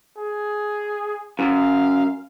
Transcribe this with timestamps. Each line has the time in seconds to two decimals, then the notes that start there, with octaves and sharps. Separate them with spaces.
0.18 G#4
1.39 F#2 F5